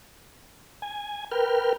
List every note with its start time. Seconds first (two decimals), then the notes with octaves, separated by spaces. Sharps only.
0.82 G#5
1.31 A#4 B4 G5 F6